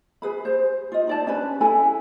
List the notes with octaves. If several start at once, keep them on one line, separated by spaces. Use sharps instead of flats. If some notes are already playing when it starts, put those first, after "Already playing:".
G#4 B4 B5
C5
F4 D#5
D#4 D5 A5
C#4 D4 B4 B5
E4 A4 G#5 B5